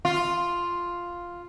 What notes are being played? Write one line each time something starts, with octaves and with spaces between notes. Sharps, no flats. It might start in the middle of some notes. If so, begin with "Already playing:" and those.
F4